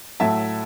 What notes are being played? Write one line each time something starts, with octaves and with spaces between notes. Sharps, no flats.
A2 F#3 A3 E5 A5